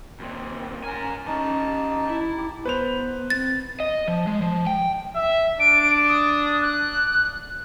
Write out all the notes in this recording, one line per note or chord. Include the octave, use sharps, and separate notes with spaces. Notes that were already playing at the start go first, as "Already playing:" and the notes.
D#2 A#2 C4
C#4 A#4 G#5 A#5
E3 C#4 D#4 A5
E4
G4
B3 B4 C5 F7
C4 A6
D#5
F3
G#3
F3
G5
E5
D4 D7
D#6
F#6